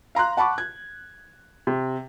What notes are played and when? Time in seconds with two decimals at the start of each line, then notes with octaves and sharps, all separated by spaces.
0.15 F5 A#5 C6 F#6
0.37 F#5 A5 B5 C#6 D6
0.58 G#6
1.67 C3